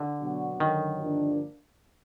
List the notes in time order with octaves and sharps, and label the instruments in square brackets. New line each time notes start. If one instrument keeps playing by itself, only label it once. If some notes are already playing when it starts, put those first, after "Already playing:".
Already playing: [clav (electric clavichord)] D3
[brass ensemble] B2 F#3 B3 D4 F#4
[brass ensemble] F#2 D3 F#3 [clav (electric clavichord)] D#3
[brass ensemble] G2 D3 F3 A#3 D4